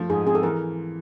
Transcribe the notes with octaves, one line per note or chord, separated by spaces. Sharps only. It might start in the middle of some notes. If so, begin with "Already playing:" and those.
Already playing: F3 A3
G#2 G#4
C4 G#4
A4
E3 A#4